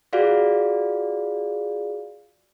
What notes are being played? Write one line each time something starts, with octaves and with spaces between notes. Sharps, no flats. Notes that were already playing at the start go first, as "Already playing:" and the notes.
F4 F#4 G#4 D5 F5